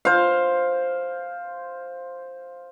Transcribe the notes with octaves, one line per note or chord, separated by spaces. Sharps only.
C5 F5